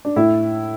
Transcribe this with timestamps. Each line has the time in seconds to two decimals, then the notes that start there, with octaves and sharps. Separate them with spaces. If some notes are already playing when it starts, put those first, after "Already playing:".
0.05 D4
0.16 A2 E4